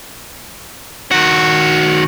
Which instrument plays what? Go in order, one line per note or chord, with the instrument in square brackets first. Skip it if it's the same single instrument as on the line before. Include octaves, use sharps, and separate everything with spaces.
[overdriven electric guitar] D#3 F#4